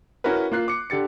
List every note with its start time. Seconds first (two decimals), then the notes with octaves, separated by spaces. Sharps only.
0.24 C#4 E4 F#4 A#4 B4
0.52 A#3 F4 F#6 C7
0.68 D6 C#7
0.90 D3 G4 A6 C#7